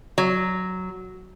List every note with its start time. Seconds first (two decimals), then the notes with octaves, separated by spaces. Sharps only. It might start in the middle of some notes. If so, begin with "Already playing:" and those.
0.18 F#3